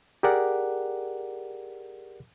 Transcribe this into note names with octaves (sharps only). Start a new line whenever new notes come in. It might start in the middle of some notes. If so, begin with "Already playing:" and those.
G4 G#4 A#4 D5 F#5